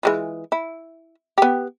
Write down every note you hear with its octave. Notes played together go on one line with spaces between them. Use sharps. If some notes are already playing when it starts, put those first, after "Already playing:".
E3 G#3 F4
E4
B3 G4